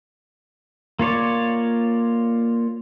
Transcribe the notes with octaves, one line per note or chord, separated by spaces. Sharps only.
A#3 F4 C#5 D5